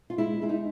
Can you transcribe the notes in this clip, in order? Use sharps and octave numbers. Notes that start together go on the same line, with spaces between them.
F4
G#3 E4
G#3 E4
D#4